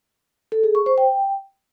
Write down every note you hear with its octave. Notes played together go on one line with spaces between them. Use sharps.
A4
G#4
C#6
C5
G5